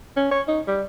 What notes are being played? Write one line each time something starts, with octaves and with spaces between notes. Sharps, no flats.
C#4
C#5
D#4
G3